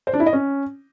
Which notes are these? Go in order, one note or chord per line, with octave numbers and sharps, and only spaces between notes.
C5
D4
E4
D#5
C#4